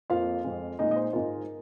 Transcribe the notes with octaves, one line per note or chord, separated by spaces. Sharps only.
F2 F3 A#3 F4 F5
F2 F3 G#3
A#2 G#3 D#4 D#5
D#5
C5
G#2 G#3 F4 A#4